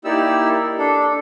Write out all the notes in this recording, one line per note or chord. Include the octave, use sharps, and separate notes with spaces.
A#3 D#4 E4 G4 D5 E6
D4 A4